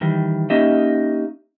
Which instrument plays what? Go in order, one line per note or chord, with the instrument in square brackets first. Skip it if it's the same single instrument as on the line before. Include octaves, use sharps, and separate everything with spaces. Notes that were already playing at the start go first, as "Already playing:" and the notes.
[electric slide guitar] D#3 E3 G3
A#3 C#4 D#4 G4 D#5 E5